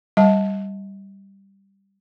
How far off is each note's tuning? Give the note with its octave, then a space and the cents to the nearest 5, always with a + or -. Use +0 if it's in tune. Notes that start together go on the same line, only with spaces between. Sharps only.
G3 +0 D#5 +40 A5 +0